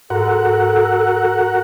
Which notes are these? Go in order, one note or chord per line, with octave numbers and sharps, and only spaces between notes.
G#2 F#4 A4 A#4 F#5